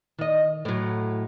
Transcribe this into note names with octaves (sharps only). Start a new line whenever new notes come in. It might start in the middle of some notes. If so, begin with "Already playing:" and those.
D#3 D#5
A2 F#3